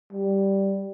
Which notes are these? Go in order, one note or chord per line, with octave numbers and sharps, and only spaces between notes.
G3